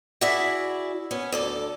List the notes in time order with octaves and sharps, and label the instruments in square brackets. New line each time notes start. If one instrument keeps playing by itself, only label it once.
[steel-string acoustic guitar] E4 F#4 G#4 D5 E5
B3 C#4
D2 A4 D5